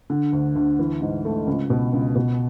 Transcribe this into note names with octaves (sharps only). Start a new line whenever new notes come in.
D3
D2
D2
E3
G#2
A3
C#2
B2
C#2
B2